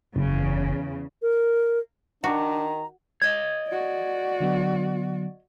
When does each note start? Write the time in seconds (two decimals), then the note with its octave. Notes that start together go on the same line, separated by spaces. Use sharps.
0.16 F#1 E2 C#3
1.22 A#4
2.24 D#3 D4 F#4 A#5
3.22 C#5 D#5 G#6
3.68 F#4 D5
4.40 D3 F#3 B3